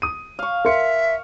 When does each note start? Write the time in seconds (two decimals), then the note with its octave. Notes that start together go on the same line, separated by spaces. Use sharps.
0.02 D#6 D#7
0.39 F5 C#6
0.65 A#4 E5 C6 C#7